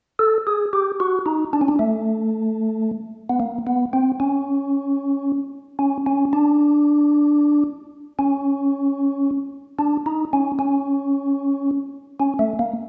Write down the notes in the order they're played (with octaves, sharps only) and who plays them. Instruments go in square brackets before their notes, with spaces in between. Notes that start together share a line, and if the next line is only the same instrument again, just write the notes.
[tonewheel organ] A4
G#4
G4
F#4
D#4
D4
C#4
D4
A3
B3
A#3
B3
C4
C#4
C#4
C#4
D4
C#4
D4
D#4
C#4
C#4
C#4
A3
A#3